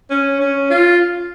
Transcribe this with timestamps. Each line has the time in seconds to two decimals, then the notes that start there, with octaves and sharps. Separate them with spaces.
0.11 C#4
0.40 C#4
0.70 F4